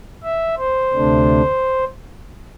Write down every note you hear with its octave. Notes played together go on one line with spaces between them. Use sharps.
E5
C5
D2 C3 A3 D4